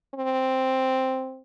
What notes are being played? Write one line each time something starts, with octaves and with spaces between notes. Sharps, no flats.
C4